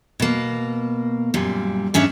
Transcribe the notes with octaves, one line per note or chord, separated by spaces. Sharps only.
B2 A#3
F#2 A#2 G3
G#2 C#4 D4 E5